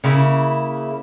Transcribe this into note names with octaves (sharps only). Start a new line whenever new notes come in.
C#3 A#3 E4